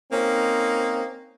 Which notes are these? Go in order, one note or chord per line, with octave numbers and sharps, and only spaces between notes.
A#3 C4 C#4 D#4